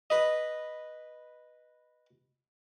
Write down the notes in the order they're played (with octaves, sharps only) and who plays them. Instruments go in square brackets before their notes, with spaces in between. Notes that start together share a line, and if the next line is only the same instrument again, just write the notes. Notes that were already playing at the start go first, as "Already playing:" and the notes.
[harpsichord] B4 D#5